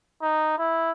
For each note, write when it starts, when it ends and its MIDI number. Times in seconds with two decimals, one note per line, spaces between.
0.22 0.54 63
0.58 0.91 64